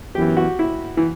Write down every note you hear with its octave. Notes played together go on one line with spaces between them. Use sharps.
F#2 E3 B3 G4
F#4
E4
E3